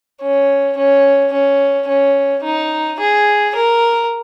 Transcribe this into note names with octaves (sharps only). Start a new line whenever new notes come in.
C#4
C#4
C#4
C#4
D#4
G#4
A#4